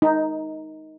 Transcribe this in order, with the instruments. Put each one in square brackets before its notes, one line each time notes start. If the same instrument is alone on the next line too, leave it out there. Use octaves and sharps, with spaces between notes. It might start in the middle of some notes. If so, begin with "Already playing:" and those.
[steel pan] D#4